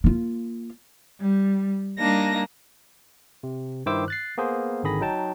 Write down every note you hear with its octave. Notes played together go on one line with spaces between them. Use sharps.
A#3 F4
G3
G3 A#3 D4 D#4 A#6
C3
G2 D#3 E4 C5 D6 E6
F#6 A6 C7
A#3 B3 G#4 C5
G#1 D3 D#3 G#4 B5 A#6
F#3 D#4 G5 A5